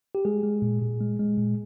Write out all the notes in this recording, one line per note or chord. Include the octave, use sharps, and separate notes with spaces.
G4
G#3 G#4
G#3
A#2
A#2
G#3
G#3
A#2